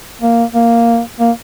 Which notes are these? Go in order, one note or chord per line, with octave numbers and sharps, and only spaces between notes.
A#3
A#3
A#3